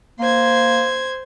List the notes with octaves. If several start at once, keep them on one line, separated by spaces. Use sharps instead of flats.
A#3 C5 G#6